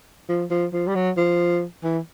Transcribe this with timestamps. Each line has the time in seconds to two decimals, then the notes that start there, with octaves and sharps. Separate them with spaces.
0.29 F3
0.50 F3
0.73 F3
0.87 G3
0.95 F#3
1.17 F3
1.83 E3